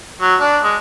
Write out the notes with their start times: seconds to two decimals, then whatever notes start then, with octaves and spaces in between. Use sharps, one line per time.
0.21 F#3
0.40 D4
0.64 G#3